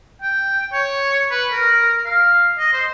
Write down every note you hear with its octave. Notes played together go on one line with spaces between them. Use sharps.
G5
C#5
B4
A#4
F5
D#5
C5